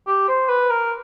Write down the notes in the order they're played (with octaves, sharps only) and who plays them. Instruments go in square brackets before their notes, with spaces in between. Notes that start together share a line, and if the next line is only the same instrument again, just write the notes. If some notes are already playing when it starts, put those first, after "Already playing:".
[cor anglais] G4
C5
B4
A#4